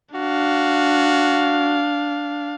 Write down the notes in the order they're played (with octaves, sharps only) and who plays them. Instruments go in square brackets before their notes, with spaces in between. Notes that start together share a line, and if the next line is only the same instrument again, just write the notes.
[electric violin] D4 F5 [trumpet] F#4